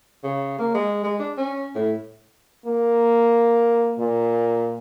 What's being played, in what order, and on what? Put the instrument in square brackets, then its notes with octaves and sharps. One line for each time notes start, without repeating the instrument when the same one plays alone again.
[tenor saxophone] C#3
A#3
G#3
G#3
D4
C#4
A2
[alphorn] A#3
A#2